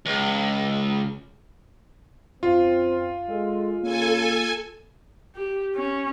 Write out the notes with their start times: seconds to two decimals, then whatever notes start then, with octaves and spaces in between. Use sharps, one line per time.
0.06 C#2
2.43 F#2 C4 F4
3.29 G#3 A4
3.82 C#3 A#3 A4 G#5
5.35 G4
5.76 C#4